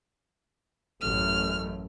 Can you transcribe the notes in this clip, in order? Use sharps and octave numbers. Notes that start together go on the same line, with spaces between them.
A1 F#2 A3 F6